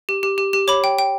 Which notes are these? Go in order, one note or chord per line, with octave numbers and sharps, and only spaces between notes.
G4
G4
G4
G4
C#5 B5 D6
G5
G5